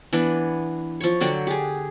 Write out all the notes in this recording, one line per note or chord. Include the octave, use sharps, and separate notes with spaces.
E3 B3 D4
F3 C#5
D3 F#3 D4 G5
G4 G#4